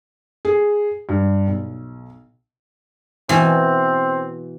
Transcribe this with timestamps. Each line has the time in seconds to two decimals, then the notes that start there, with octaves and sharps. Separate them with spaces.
0.45 G#4
1.09 G2
1.47 B1
3.29 B2 E3 C4